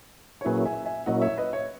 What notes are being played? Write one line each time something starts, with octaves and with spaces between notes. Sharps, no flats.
C#5
A#2 F#3 A#3 C#4 E4 G#4 B4
E5 G#5
E5 G#5
A#2 F#3 A#3 C#4 E4 D#5 F#5
C#5 E5
B4 D#5
C#5 E5